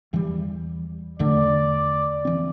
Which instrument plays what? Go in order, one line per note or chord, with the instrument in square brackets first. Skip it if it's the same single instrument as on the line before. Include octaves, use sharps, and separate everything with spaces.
[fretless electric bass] E2 E3 G3
[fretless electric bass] E2 D3 A3 [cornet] D5
[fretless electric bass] E3 C4